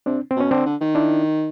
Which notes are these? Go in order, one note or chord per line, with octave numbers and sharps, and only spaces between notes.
C3 C4 D4
C4
B2 C#4
D3 C4 D4
D3
D#3
D4 E4